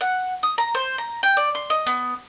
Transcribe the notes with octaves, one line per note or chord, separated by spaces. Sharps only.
F#5
D#6
A#5
C5
A#5
G5
D5
C6
D#5
B3